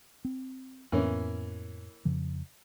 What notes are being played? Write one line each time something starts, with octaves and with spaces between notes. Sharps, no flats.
C4
F2 A2 E3 A#3 B3 C#4
F2 C#3 F3